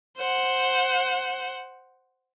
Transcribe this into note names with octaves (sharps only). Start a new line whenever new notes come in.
C5 F#5